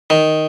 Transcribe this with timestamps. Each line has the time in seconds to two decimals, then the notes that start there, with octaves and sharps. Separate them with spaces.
0.10 D#3